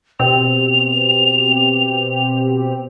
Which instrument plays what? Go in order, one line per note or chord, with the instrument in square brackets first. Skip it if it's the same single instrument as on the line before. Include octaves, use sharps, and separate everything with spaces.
[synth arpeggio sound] B2 C4 G4 [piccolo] F7